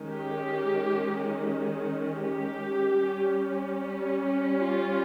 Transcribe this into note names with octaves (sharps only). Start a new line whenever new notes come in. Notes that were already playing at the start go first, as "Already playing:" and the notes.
Already playing: D#3 G#3 C#4
G4
G4
G3 C#4
F4